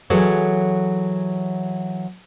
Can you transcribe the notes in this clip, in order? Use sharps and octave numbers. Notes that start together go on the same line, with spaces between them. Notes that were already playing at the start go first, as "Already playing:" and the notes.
E3 F#3 G#4 A4 C#5